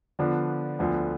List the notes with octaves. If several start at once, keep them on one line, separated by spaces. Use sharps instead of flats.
D3 F3 B3 D4
D2 D3 F3 B3